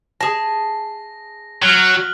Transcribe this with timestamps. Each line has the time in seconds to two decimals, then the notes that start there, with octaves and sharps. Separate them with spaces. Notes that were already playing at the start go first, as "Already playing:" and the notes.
0.21 G#4 A5 A#6
1.62 F#3 F6 F#6 F#7